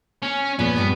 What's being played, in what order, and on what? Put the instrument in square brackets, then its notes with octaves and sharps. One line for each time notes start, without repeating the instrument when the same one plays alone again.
[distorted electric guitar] C#4
[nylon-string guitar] E2 A#2 F3 [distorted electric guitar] B3
[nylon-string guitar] G2